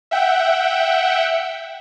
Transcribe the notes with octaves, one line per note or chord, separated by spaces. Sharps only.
E5 F#5 G5